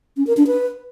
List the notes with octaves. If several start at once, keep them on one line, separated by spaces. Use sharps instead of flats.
C#4
A#4
D4
B4